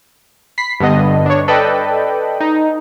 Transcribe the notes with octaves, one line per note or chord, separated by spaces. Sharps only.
B5 B6 C7
G2 D3 B3 D#5
D4 C#5
A4 B4 D5 D#5 G5 B5
D#4